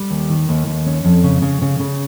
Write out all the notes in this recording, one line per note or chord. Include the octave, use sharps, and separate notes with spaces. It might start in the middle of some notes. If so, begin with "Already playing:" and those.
Already playing: G3
D#2
D#3
D#2
D#2
C#4
F2
C#3
C#3
C#3
C#3